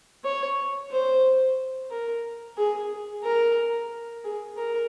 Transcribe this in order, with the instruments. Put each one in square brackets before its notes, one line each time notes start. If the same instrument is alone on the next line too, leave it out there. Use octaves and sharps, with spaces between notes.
[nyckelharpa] C#5
C5
A#4
G#4
A#4
G#4
A#4